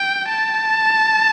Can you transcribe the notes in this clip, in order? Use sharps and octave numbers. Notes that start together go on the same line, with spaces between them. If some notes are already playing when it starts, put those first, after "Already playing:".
Already playing: G5
A5